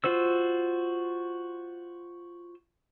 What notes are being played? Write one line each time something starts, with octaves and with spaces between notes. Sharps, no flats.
F4 F#4 C5 E6